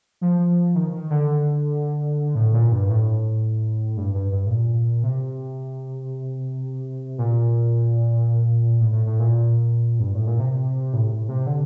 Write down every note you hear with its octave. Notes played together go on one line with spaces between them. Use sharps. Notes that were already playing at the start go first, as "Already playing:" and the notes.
F3
D#3
D#3
D3
A2
A#2
G2
A2
G2
G2
G2
A2
A#2
C3
A#2
A2
A2
A2
A#2
G2
A2
A#2
C3
A2
A2
C3
D3